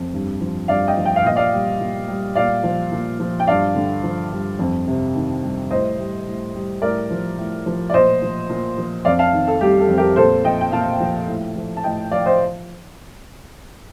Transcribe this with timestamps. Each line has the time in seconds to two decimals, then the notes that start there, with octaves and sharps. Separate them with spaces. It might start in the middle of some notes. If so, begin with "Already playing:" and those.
Already playing: F2
0.13 G2
0.41 F3
0.68 G2 D5 F5
0.88 D#5 G5
0.97 F3
1.05 G5
1.16 F5
1.25 A#2 D#5
1.36 D5 F5
1.53 G3
1.80 A#2
2.08 G3
2.35 A#2 D5 F5
2.63 F3
2.92 A#2
3.20 F3
3.40 G5
3.47 G2 D5 F5
3.75 D3
4.03 F3
4.32 G2
4.59 F2
4.87 C3
5.15 D#3
5.43 G3
5.71 A2 C5 D#5
5.98 G3
6.27 A2
6.55 G3
6.82 A2 A#4 D5
7.10 F3
7.37 A2
7.66 F3
7.90 D5
7.93 A#2 C5 D#5
8.22 F3
8.50 A#2
8.77 F3
9.05 F2 D5 F5
9.19 F5 A5
9.33 D#3
9.48 A4
9.61 G3 G4
9.80 A4
9.89 F2
9.98 G4 A#4
10.16 A#2 A4 C5
10.44 F3 D#5 G5
10.61 G5
10.72 A#2 F5 A5
11.00 F3
11.28 A2
11.56 F3
11.77 A5
11.84 A2 D#5 G5
12.11 F3 D5 F5
12.26 C5 D#5